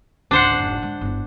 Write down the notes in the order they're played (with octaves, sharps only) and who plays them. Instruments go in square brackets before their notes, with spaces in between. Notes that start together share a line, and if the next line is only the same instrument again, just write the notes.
[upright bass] G#1 C#2 [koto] D4 C5 F#5
[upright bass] F1 G#2
G#3
G1 E4